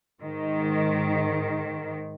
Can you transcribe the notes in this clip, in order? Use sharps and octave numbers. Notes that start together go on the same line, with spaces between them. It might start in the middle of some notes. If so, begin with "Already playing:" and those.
G#2 D#3